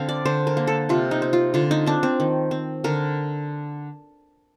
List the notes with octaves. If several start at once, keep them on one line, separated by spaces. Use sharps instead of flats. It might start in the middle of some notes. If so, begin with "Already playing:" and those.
Already playing: D3 C4 F5
D5
D3 C5
A#4
A#3
A4
C3 F4
D#4
C4
F4
D3 F4
D#4
C4 D4
C4
D#3
C4
D3 A#4